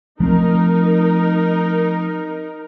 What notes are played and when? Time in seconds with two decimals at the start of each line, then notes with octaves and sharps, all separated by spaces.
0.20 F3 A3 C4 D#4 A#4